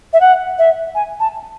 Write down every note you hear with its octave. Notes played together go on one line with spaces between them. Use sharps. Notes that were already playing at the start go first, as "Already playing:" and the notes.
E5
F#5
E5
G#5
A5